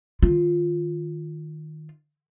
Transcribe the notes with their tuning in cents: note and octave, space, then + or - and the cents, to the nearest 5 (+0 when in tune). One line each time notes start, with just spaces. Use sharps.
D#3 -5 F4 +0